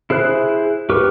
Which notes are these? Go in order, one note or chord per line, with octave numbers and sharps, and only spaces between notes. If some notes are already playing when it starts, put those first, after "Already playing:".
E4 G#4 C5 F#6
G4 A#4 B4 C#6